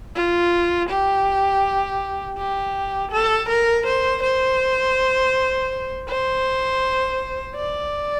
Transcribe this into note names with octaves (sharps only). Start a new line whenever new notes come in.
F4
G4
G4
A4
A#4
C5
C5
C5
D5